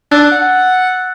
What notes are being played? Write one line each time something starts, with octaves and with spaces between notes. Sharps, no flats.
D4 E6 F#6 A6
F#5